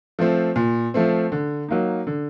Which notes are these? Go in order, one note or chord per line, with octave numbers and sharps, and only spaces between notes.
F3 A3 C4
A#2
F3 A3 C4
D3
F#3 A#3 D#4
D3